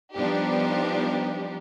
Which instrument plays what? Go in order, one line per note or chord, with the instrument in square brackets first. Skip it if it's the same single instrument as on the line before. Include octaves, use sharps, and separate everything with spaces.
[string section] F3 G3 B3 D4 D#4 G4